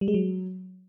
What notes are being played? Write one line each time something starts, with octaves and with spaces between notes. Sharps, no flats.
G3
G#3
F#3